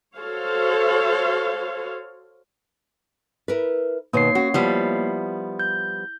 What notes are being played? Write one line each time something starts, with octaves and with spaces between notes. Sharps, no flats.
F#4 A4 C5 C#5 F5
E4 A#4 B4
B2 D#3 A#3 C#5 C7
C#4 F#4
F3 G3 B3 E4
G6